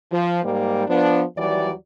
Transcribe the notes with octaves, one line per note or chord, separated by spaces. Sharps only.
F3
G#2 G3 A#3
F3 B3 D4
D#2 E3 F#3 G3 D5